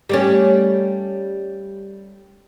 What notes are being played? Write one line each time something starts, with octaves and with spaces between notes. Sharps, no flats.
G3 A3 C#4